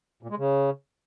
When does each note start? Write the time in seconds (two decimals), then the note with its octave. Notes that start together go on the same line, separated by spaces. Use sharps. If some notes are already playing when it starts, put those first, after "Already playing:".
0.23 A#2
0.30 G#3
0.38 C#3